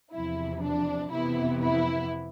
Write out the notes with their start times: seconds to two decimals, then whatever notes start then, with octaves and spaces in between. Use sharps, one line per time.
0.12 E2 C3 F3 E4
0.61 D4
1.10 F2 C3 E3 B3 E4
1.61 E4